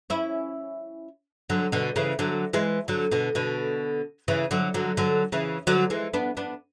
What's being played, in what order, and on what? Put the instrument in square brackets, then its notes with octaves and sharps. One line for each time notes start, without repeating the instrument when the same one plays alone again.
[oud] C#4 E4
D3 F#3
B2 D3
C#3 E3
D3 F#3
E3 G#3
D3 F#3
B2 D3
B2 D3
C#3 E3
D3 F#3
D3 F#3
D3 F#3
C#3 E3
D3 F#3
E3 G#3
B3 D4
B3 D4